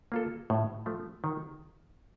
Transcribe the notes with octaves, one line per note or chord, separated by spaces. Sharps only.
A#3 F4 A4
A2
F3 A3
D#3